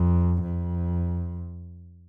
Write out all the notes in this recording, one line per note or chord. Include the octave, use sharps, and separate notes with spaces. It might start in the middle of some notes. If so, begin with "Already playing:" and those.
Already playing: F2
F2